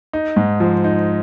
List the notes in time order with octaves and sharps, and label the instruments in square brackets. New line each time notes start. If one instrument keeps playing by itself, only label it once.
[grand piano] D#4
G#2
F3
D#4